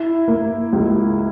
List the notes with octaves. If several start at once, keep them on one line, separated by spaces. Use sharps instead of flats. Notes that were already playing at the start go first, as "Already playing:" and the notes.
Already playing: E4
A#3
C#2